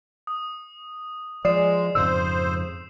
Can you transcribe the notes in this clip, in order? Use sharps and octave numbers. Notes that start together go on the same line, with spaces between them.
D#6
F3 G#3 D5 D#6 C7 E7
F2 G#2 C#3 C5 E6